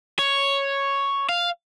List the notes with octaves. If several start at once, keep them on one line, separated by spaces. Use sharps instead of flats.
C#5
F5